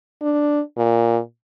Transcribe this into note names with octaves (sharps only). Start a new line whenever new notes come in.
D4
A#2